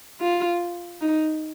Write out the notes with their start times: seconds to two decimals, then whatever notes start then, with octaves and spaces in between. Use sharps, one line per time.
0.21 F4
1.01 D#4